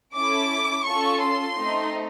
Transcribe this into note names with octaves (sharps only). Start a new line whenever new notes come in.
C#4 E4 A4 D6
C#4 F4 A4 C#6
C6
A3 C4 D#4